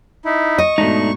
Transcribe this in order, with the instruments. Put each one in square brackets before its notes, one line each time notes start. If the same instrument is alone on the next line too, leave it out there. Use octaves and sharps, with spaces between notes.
[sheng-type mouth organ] D#4 E4
[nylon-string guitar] D#5 [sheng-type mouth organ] C#6
[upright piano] G#2 B2 [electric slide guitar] A3 D4 D#4